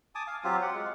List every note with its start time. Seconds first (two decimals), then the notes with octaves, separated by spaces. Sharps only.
0.15 G#5 A5 D6 D#6
0.27 F5 G#5
0.44 F#3 C4 F4 G4
0.62 F#5
0.73 G#3